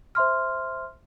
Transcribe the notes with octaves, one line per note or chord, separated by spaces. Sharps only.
C5 E5 C6 F6